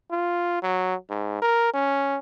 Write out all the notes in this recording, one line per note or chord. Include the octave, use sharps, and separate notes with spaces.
F4
F#3
G#2
A#4
C#4